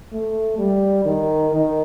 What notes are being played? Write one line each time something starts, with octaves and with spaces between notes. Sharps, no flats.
A3
G3
D#3
D#3